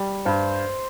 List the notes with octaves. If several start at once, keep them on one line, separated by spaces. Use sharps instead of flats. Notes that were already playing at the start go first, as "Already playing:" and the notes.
Already playing: G3
G2 C5